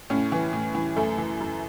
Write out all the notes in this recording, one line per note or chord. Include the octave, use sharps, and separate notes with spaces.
A2 C#4
E3
A2
E3
F#2 A3
E3
F#2